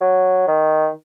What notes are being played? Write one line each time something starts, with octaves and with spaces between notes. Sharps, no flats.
F#3
D#3